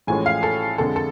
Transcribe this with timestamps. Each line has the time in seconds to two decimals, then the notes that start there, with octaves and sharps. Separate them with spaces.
0.07 A1 A2 F3 G#3 C#4 G#5
0.26 F5
0.43 A4
0.78 F2 D3 G#3 A4
0.96 A4